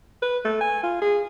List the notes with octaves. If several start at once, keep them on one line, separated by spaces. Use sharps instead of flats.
B4
A3
G#5
F4
G#4